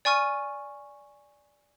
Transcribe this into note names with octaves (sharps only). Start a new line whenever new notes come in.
D5 G#5 C#6 F6 D#7